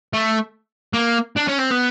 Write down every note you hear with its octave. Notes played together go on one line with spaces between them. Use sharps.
A3
A#3
D4
C#4
C4
B3